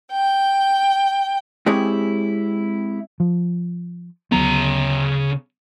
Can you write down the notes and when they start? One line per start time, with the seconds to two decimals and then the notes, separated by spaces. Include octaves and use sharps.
0.11 G5
1.66 G#3 C4 E4 G4 G#4 C#5
3.20 F3
4.32 D2 C#3 F#3 B3 A#5